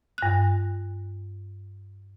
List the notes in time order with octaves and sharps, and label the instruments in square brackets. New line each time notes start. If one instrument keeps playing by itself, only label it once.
[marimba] G2 F#6